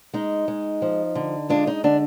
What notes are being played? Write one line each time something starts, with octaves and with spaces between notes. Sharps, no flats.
G#3 D#4
G#3
F3
D3
G#3 D4 F4
D#4
D3 D4